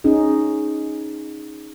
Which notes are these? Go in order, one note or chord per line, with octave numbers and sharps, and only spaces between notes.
C#4 D#4 G#4